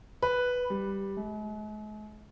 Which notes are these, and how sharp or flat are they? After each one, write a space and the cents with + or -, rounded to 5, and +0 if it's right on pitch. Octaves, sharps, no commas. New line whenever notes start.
B4 +0
G3 +0
G#3 +45